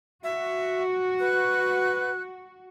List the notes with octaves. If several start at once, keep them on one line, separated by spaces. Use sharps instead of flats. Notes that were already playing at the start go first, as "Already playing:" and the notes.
F#4 E5
B4 F#6